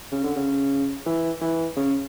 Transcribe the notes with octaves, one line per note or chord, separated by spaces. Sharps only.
C#3
D3
C#3
E3
E3
C#3